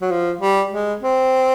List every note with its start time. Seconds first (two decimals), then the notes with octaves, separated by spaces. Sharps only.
0.01 F#3
0.11 F3
0.41 G3
0.72 G#3
1.02 C4